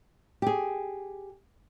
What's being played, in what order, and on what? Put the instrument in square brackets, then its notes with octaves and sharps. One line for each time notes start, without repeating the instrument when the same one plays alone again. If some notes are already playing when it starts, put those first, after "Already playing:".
[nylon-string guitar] G4 G#4